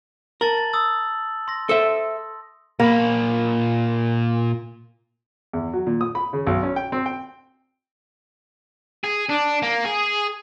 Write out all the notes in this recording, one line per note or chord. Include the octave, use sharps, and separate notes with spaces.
A#4 A5 A6 F#7
A6
D#6 E6 A6
C6 A#6
A4 C5 E5
A#2 A#3 B5
E2
F#3
A#2
D#6
B5
C#3
B1
C#4
G5
C4
G5
G#4
D4
A#3
G#4